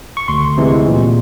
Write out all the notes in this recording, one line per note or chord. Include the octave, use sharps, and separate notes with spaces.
C#6
D2 C6
C3 E3 G#3
A#2